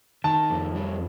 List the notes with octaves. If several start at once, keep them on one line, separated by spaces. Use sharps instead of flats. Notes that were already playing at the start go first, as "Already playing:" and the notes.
D#3 A5
F2
G3